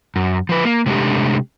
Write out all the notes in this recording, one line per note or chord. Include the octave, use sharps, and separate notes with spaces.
F#2
F3 B4
A#3
C3 G#3 A3 D4 G4